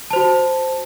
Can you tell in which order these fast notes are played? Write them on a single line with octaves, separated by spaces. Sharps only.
A5 C5 F#4